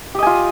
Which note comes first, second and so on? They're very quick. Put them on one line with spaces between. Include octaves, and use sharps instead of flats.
G4 D#5 G#5 F4